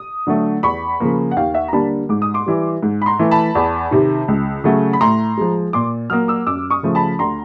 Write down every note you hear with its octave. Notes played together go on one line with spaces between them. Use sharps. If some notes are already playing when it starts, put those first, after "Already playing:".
Already playing: D#6
D3 F#3 A3
E2 B5 C#6
C#3 F3 A#3
F#5
D#2 F5 G5
E5 F#5
A#5
D3 G3 A#3 A5 B5
G#2 D6
D#6
C6 D6
E3 G3
G#2
B5
A#5 C6
E3 A3
A5 B5
E2
C3 D#3
C#2
C#3 F#3 A3
B5
A2 A#5 C6
F3 G#3
A#2 C6 D6
F#3 A#3 D#6 F6
D6 E6
F#2 D6 E6
C#6 D#6
C#3 F3 A3
A5 B5
D2 A#5 C6